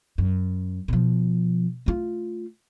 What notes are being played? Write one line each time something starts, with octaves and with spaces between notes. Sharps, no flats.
F#2
B2 F3
A3 F4